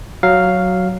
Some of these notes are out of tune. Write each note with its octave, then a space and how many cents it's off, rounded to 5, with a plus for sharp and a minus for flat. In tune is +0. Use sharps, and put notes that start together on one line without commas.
F#3 +5 F5 +0